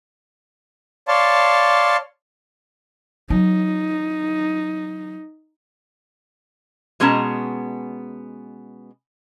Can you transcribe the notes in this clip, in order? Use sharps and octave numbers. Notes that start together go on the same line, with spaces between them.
C#5 D5 F5 A5 C6
F#3 D#4
B2 G#3 B3 C#4 A5 A#5